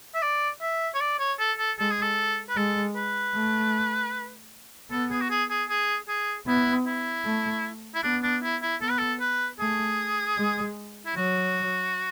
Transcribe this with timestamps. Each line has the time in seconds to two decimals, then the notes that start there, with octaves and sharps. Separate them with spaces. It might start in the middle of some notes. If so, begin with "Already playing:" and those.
0.14 E5
0.22 D5
0.61 E5
0.94 C#5
1.01 D5
1.19 C#5
1.39 A4
1.58 A4
1.79 G#3 A4
1.90 G#4
2.02 A4
2.49 B4
2.56 G#3 A4
2.96 B4
3.35 A3
4.91 B3 A4
5.11 G#4
5.21 F#4
5.30 G#4
5.50 G#4
5.69 G#4
6.08 G#4
6.47 B3 E4
6.86 E4
7.25 A3
7.94 E4
8.03 B3 D4
8.23 D4
8.43 E4
8.62 E4
8.82 B3 A4
8.90 B4
8.98 A4
9.20 B4
9.59 A3 G#4
10.38 G#3
11.06 E4
11.15 F#3 F#4